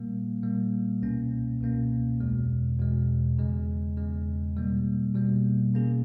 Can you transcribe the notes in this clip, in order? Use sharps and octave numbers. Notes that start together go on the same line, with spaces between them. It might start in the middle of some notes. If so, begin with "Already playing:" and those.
Already playing: A#2 G3 A#3
A#2 G3 A#3
C#2 B2 A#3 C#4
C#2 B2 A#3 C#4
E2 B2 G#3
E2 B2 G#3
E2 C#3 G#3
E2 C#3 G#3
B2 G3 A#3
B2 G3 A#3
B2 A#3 C#4 G#4